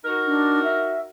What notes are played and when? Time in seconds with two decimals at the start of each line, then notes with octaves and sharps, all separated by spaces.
0.05 D#4 F#4 A#4
0.27 D4
0.64 E5